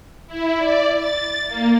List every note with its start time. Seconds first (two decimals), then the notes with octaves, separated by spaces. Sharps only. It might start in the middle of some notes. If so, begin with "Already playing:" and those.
0.27 E4
0.58 D5
0.95 A6
1.48 A#3